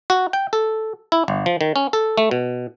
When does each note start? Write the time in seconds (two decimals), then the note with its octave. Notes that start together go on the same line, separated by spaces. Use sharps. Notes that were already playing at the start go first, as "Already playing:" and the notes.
0.10 F#4
0.33 G5
0.53 A4
1.12 E4
1.28 G1
1.46 F3
1.61 D#3
1.76 C#4
1.93 A4
2.18 A3
2.31 B2